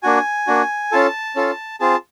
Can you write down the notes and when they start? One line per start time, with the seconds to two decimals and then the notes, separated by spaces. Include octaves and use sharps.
0.03 A#3 D4 F#4 G#5
0.47 A#3 D4 F#4
0.92 C#4 F4 A4 A5
1.36 C#4 F4 A4
1.80 C4 F4 G#4 A5